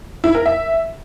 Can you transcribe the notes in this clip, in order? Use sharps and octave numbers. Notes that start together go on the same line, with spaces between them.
E4
A#4
E5